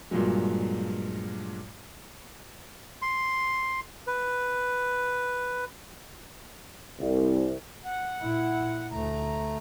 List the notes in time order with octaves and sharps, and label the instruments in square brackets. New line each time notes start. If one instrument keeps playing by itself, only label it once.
[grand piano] G2 A#2 F3 F#3 G#3
[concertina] C6
B4
[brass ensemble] C2
[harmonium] F#5
[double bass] A#2 E4
[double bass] D2 [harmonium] A3 A#5